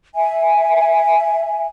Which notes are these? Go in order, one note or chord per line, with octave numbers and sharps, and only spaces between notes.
E5 G#5